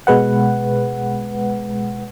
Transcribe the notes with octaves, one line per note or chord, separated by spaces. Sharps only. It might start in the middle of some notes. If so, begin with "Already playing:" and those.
B2 G#3 B4 F#5